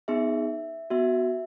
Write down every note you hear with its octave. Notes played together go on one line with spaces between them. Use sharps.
B3 D#4 G#4 E5
B3 F#4 E5